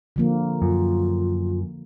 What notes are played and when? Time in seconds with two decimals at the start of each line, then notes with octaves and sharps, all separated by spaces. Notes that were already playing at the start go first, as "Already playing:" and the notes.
0.16 D3 F3 A#3
0.62 F#2 F4